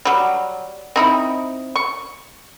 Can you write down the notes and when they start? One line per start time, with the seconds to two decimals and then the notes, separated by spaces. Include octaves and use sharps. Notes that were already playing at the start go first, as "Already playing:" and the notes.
0.05 F#3 G3
0.96 C4 D#4 E4
1.76 C#6